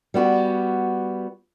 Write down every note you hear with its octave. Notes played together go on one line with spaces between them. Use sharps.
G3 B3 F#4